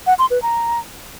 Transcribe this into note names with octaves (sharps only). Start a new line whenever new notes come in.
F#5
C6
B4
A#5